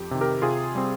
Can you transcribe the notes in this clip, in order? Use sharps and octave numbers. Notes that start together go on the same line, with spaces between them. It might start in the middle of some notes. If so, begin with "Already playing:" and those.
Already playing: F2 G4
C3 D#3
G4 A#4
C3 F4 G#4
G3 C4